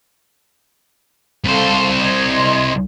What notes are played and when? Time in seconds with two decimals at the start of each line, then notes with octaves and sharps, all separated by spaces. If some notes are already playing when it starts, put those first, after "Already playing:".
1.45 C2 A4 C5 F5
2.01 D#5 C6 G#6